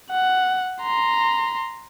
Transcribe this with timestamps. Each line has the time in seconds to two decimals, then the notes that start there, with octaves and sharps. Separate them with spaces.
0.11 F#5
0.82 A#5 C6